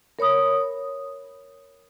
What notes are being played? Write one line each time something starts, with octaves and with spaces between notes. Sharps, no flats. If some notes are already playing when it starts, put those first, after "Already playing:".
A#4 C#5 B5 D#6